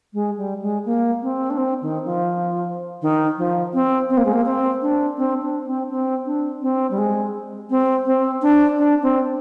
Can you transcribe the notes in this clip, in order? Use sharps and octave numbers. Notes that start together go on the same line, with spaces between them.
G#3
G3
G#3
A#3
C4
D4
C4
D#3
F3
D#3
F3
C4
C4
A#3
G#3
A#3
C4
D4
C4
D4
C4
C4
D4
C4
G3
G#3
C4
C4
D4
D4
C4